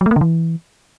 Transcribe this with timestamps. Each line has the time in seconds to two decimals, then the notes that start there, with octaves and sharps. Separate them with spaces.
0.01 F#3
0.06 A3
0.11 A#3
0.16 D3
0.21 E3